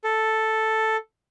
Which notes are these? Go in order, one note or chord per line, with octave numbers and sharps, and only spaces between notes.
A4